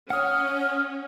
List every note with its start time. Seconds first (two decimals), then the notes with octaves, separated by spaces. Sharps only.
0.10 C#4 F#5 D#6 F6